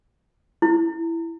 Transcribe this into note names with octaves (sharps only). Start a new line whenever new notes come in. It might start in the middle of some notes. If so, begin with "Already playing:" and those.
E4